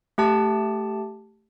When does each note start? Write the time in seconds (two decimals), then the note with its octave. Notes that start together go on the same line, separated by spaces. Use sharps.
0.18 A3 G4 A5